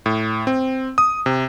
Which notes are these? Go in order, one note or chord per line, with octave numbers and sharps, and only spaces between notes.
A2
C4
D#6
C3